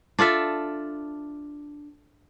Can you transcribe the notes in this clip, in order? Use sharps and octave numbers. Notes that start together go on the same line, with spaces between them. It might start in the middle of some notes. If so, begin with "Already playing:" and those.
D4 F4 A4 E5